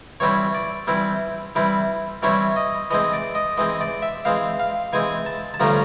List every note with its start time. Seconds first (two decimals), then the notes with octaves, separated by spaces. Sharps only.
0.20 E3 G3 C4 E4 C#5
0.54 D5
0.87 E3 G3 C4 E4
1.56 E3 G3 C4 E4
2.22 E3 G3 C4 E4 C#5
2.56 D#5
2.91 E3 G#3 C4 D#5
3.13 D5
3.35 D#5
3.57 E3 G#3 C4 D#5
3.81 D5
4.02 E5
4.25 E3 G#3 C4 F5
4.60 F5
4.93 E3 G#3 C4 G#5
5.26 A5
5.54 A5
5.60 G2 D3 F3 A3 C#4 A#5